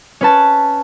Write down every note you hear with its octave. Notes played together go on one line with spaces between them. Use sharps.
C#4 B4 A5